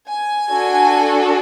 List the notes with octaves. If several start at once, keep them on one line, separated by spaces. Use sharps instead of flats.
G#5
D4 F#4 A4